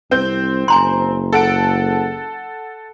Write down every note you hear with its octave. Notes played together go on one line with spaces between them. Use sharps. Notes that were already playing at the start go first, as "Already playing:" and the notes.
C2 C4 G6
F#1 G#5 A#5 C6
A4 F#5 D7